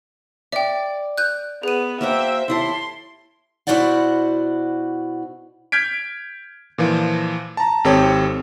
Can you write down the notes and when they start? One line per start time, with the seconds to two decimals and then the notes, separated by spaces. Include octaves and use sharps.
0.52 D5 E5 G5
1.18 F#6 G6
1.63 B3 G#4 D#7
2.01 A#3 F#4 C5 E5 G5
2.48 D#2 E4 A4 C6
3.67 B2 E4 F#4 C5 D5 F#5
5.72 F6 G6 G#6 B6 D7
6.78 A#2 E3 F3
7.57 A5 A#5
7.84 G#1 C4 G4 A4 C#5